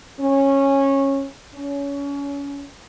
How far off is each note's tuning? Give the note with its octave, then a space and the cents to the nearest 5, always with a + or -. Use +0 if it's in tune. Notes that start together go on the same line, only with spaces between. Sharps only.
C#4 -15
C#4 +25